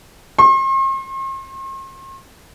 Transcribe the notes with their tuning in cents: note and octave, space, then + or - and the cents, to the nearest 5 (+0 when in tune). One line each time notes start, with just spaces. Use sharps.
C6 +45